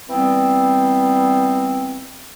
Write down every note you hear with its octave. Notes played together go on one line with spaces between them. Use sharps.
E3 G3 B3 C4